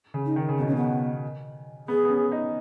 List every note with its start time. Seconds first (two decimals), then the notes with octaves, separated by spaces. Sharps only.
0.14 C#3
0.25 D#4
0.36 D#3
0.49 C#3
0.58 B2 B3
0.67 C#4
0.73 C#3 B3
1.88 B3 G#4
2.05 B3
2.10 C#4
2.32 D#4